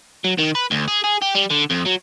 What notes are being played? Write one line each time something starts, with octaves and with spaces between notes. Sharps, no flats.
F#3
D#3
B4
D2
G#4
G#4
G4
G3
D3
F2
F#3